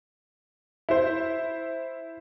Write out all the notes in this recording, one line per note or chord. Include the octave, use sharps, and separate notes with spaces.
E4 C5